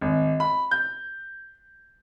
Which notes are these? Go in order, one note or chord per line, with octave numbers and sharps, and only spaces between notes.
G#1
B5
G6